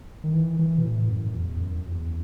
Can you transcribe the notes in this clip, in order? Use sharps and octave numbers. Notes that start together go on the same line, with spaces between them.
D#3
E3
E3
B2
A2
F#2
E2
F#2
E2